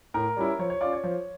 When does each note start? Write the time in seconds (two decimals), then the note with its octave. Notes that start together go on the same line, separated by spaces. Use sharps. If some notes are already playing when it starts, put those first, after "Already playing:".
0.14 A2 A#4
0.37 G3 C#4 E4
0.59 F3 C#5
0.70 C#5
0.81 C#4 F4 D5
0.93 C#5
1.04 F3